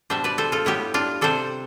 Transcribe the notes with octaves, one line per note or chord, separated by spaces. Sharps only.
B2 G3 D4 C5 E5
B4 D5
A4 C5
F4 A4
A2 G3 B3 E4 G4
D4 F4
C3 G3 D4 A4 C5